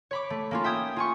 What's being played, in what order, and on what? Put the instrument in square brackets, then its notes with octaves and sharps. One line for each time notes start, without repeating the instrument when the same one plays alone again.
[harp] C#5 B5 D6
A3
A#3 C#4 F4
E5 G5 D#6 G#6
F4 G#5 C#6